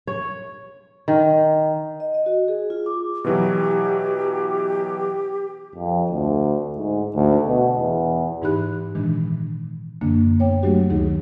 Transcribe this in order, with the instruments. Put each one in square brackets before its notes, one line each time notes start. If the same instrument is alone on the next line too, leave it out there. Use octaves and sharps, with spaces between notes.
[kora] C#5
D#3
[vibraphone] D#5
D#5
F#4
G#4
F4
D6
[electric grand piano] B2 E3 F#3 [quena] G4
[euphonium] F2
D2
G#2
D2
B2
E2
[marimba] G#2 E3 D#4 G4 B5 F#6
A#2 D#3 E3 G#3 D4
F#2 D3 A#3 D4
B3 C#5 G5
F#3 A3 D4 F#4 G4
D2 D#3 D#4 G#4